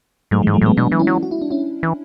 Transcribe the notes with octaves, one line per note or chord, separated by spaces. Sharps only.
G#2 F#3 A3
E3 G#3
G#2
F#3 A3
A2 G#3 B3
B2 B3 D4
E3
C#4 E4
F#3
F#4
E4
D4
C#4 E4
E3